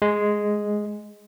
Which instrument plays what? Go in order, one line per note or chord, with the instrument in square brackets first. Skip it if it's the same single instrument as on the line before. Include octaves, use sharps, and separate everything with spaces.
[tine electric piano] G#3